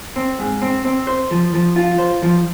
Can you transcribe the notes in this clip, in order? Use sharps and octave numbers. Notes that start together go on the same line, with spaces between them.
C4
G#2
C4
C4
C5
F3
F3
F4
C5
F3